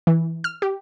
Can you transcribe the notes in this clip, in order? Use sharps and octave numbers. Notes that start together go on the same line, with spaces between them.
E3
F6
G4